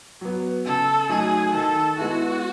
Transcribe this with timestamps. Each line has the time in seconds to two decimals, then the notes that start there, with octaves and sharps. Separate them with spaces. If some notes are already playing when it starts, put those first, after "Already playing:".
0.21 F#3 B3
0.65 C#3 A4
1.09 F#3 A3 D#4 G#4
1.53 D#3 A4
1.98 G#3 B3 E4 F#4